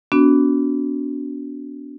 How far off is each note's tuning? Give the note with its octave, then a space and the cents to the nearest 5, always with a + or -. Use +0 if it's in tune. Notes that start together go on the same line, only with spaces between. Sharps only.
B3 +0 D4 -35 F#4 +0